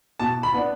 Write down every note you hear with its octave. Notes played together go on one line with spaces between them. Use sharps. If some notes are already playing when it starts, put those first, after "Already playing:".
B2 A5
B5
B3 D4